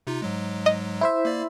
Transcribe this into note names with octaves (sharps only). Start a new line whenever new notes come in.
C3 D#4 F4
G#2 F#3 G#3
D#5
E4 C5 E5
A#3 D5